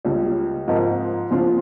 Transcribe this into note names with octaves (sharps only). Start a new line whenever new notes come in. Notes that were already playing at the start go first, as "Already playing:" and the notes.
C#2 C#3 G3
G#2 F3 C4 D#4 A#4
C#3 F3 C4 F4